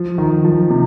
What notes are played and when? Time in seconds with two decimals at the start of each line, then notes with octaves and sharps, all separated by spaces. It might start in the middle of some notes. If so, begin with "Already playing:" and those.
Already playing: F3
0.18 D#3
0.45 F3
0.70 C3